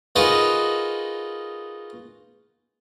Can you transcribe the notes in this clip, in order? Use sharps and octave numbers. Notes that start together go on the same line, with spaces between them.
D#4 F4 F#4 G#4 A#4 B4